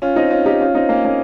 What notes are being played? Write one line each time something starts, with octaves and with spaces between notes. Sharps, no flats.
C#4 F4
C4 D#4
C#4 F4
D#4 G4
C#4 F4
C4 D#4
A#3 C#4
A#3 C#4